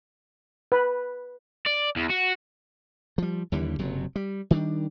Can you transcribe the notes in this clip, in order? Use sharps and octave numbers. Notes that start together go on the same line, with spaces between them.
B4
D5
E2
F#4
F3 G3
D#2 D3 E3 G3
F#1 C3 F#3
G3
D#3 G3 D4